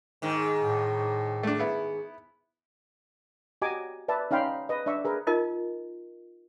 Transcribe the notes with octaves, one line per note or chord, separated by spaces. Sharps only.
G#2 D#3
A2
A3 D4
B3 E4
F#4 G4 D#5 G#5 A#5 D6
B4 D5 E5 A5
C#4 D#4 F5 G5 B5 C6
B4 D#5
D4 D5 E5 C#6
G#4 A#4 B4
D#4 F4 A#4 D#5